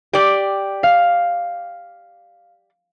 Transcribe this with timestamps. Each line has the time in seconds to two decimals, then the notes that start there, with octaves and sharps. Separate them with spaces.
0.13 G4 D5 G5
0.83 F5